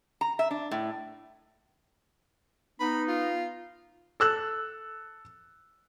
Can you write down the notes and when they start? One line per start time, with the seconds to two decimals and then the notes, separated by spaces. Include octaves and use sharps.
0.21 A#5
0.39 E5
0.51 D4
0.71 A2
2.80 B3 D#4 B5
3.08 F4
4.20 A4 E6 F#6